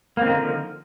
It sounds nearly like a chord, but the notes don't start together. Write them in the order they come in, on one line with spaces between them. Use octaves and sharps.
A#3 C4 D#3 D3 F3